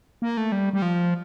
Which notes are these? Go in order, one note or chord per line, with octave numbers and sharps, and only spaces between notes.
A#3
A3
G3
G3
F3